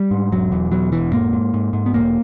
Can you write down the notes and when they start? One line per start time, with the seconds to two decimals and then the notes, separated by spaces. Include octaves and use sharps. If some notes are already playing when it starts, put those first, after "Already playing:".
Already playing: G3
0.11 G#2
0.32 E1 F#3
0.52 E2
0.72 B2 F#3
0.92 E1 E3
1.12 G#2 A#3
1.33 G#2
1.54 G#2
1.73 G#2
1.86 B3
1.94 E1 A#3